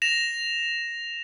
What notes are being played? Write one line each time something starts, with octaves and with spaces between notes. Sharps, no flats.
A#6 E7 F7